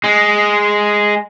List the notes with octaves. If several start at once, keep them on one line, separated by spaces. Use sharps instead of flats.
G#3